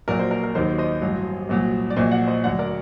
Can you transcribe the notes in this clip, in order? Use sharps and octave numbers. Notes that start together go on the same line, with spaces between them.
A#1 A#2 F#3 A#4 D5
C5
A#4 D5
A#4
D#2 D#3 F#3 C5
C5 D#5
A1 G2 F#3
C2 A#2 F#3
D5
A#1 A#2 F#3 C5 D#5
D5 F#5
C5 D#5
D2 D3 F#3 D5 F#5
A#4 D5